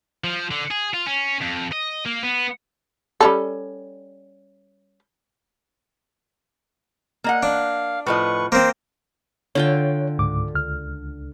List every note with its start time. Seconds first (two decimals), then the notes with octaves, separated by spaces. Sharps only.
0.24 F3
0.51 D3
0.71 G#4
0.94 F4
1.07 C#4
1.42 F2
1.72 D#5
2.06 A#3
2.23 B3
3.20 G3 C#4 A4
7.24 A#3 D#5 F#5
7.43 D4 F5
8.06 A2 F3 B4 D#5 C#6
8.52 A#3 C4 C5
9.55 D3 F4 C#5 G5
10.18 C#2 G#2 D6
10.54 C#2 F6